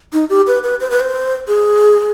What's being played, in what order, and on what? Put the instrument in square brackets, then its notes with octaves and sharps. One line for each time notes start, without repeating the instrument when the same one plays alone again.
[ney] D#4
G4
B4
B4
C5
B4
C5
G#4